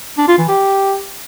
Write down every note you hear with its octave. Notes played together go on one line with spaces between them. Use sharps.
D4
F4
E3
G4